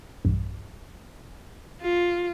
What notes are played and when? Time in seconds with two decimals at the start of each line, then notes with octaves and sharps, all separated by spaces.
0.25 B1 E2 G2
1.82 F4